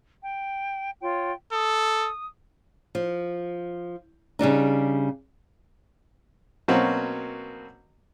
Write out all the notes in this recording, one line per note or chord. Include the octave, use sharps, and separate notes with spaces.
G5
F4 C#5 G5
A4 D#6
F3
C#3 G3 D4 D#4
B2 F#3 A#3 C4 C#4 F#4